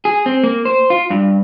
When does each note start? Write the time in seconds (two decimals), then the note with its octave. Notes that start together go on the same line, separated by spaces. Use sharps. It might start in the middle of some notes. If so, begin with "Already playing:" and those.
0.05 G#4
0.26 C4
0.43 A#3
0.65 C5
0.90 F4
1.10 G2